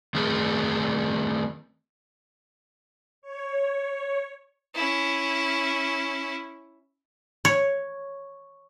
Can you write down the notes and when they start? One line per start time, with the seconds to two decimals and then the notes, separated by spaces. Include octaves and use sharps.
0.14 D#3 A3 C4 G#4 A#4
3.22 C#5
4.74 C#4 E4
7.45 C#5